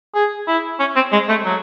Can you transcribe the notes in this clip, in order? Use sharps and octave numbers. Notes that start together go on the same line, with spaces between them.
G#4
E4
C#4
C4
G#3
A3
F#3